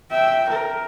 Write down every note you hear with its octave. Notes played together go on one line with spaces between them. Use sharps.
E5 G5
A#4